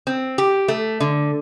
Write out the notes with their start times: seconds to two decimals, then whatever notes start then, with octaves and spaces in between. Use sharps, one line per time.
0.07 C4
0.38 G4
0.68 A3
1.00 D3